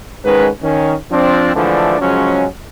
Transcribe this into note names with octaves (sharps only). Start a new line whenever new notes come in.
G#2 D#3 G#3 C#4 B4
D#3 C#4
F3 C4 D4
D3 E3 F3 G#3 A3 D4
C#3 F3 F#3 G#3 C#4